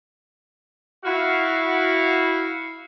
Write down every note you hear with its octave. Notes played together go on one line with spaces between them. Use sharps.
E4 F#4 F5